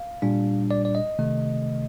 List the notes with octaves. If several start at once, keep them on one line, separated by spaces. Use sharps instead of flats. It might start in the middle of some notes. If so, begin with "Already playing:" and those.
Already playing: F5
A#2 G3 D4
D5
D5
D#5
C3 D#3 A3